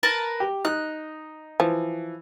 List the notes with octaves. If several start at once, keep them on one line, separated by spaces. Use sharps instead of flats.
A#4 B4 A5
G4
D#4 F#6
E3 F3